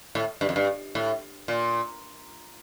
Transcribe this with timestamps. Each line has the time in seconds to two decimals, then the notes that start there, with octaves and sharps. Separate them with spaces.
0.15 A2
0.41 G2
0.49 F2
0.56 G2
0.95 A2
1.48 A#2